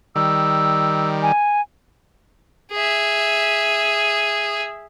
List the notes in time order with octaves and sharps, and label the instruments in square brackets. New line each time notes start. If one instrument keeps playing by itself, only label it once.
[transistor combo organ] D#3 G3 [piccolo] E6
[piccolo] G#5
[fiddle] G#4 E5